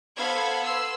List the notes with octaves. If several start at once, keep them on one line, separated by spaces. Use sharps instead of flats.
B3 A4 C5 F5 B5 G#6
B4 C6 E6